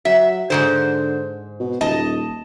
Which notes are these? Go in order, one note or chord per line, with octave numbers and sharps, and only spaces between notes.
F#3 E5
G#2 D3 D#3 C5
B2
D#1 D#5 A5